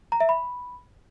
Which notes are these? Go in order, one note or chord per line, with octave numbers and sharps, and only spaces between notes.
A#5
E5
B5